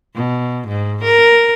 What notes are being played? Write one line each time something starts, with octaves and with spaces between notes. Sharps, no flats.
B2
G#2
A#4